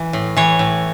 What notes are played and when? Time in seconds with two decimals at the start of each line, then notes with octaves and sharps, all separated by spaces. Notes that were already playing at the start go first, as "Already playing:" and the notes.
Already playing: E3
0.13 A2
0.36 E3 C#5
0.59 A2